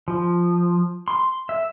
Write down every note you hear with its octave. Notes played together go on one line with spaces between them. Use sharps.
F3
C6
E5